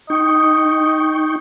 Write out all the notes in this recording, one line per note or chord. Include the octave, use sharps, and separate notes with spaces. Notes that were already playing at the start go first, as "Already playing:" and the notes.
D#4 D#5 G5 C#6